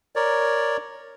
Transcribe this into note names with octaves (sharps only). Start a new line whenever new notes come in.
A#4 C#5 D5